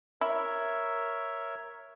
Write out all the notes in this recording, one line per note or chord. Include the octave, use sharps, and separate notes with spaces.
E4 A#4 C#5 E5